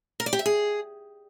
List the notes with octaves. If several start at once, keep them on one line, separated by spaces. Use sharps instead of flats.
A#4
D5
G4
E5
G#4